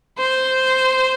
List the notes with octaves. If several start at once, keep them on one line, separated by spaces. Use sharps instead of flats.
C5